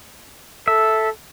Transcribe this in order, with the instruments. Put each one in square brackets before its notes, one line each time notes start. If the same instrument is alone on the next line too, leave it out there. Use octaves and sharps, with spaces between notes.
[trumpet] A4 [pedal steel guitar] E5